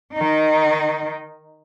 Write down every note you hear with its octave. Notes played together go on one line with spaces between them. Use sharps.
D#3 D#4